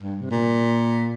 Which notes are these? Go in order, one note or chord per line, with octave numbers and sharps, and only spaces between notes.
G2
C3
A#2